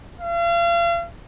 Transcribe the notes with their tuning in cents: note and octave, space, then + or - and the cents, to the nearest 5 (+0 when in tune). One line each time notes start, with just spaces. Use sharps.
F5 -40